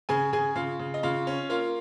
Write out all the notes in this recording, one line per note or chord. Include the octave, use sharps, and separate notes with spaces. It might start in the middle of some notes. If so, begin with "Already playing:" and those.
C#3 G#4 G#5
C#3 G#4 G#5
C#3 F4 F5
C#3
D#5
C#3 F4 F5
C#4
A#3 F4 F5